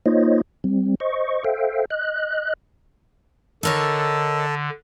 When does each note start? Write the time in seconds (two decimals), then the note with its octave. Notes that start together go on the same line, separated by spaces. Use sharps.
0.06 A#3 D#4 F4 C5 C#5 D#5
0.64 G3 C4
1.00 C5 D#5 C#6
1.44 A4 C5 E5 F5 G5
1.90 D#5 F#6
3.63 D3 D#4 A4 A#4 C#5